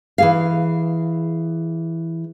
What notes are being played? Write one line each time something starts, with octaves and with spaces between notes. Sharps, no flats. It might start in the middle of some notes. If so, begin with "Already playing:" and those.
E3 G#4 F5